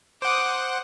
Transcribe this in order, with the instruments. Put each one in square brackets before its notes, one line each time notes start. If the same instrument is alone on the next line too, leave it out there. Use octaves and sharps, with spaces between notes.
[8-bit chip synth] C5 F#5 [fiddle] D6 D#6